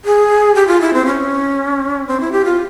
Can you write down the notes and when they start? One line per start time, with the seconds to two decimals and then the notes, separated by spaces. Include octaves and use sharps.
0.05 G#4
0.55 G4
0.67 F4
0.81 E4
0.94 C4
1.06 C#4
2.07 C4
2.20 E4
2.32 G4
2.45 F4